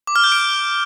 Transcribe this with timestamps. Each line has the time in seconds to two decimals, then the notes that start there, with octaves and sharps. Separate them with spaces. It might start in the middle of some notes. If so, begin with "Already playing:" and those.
0.07 D6
0.16 F6
0.24 G6
0.32 D7